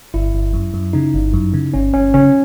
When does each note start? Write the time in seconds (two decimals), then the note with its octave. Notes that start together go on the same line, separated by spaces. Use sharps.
0.14 G1 E4
0.35 G1
0.53 F#2
0.74 F#2
0.93 C#3 D#4
1.14 G1
1.33 F#2
1.54 C#3
1.74 G1 C#4
1.93 G1 C#4
2.14 C#3 C#4